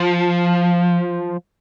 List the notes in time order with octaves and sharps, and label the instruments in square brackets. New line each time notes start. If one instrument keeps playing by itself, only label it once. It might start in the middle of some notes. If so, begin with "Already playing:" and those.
Already playing: [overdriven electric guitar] F3